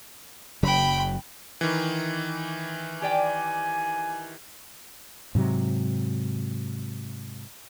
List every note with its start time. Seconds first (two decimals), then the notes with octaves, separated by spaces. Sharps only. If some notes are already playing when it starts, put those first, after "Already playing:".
0.63 F#1 C#3 F#3 G5 B5
1.61 D#3 E3
3.02 G4 D5 G5 G#5
5.35 G#2 C3 F#3